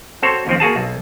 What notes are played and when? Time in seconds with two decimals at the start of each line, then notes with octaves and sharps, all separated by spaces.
0.22 C4 F#4 A4 C5 C#5
0.47 D#2 F3 C4
0.60 A#3 F#4 G#4 A5
0.76 B1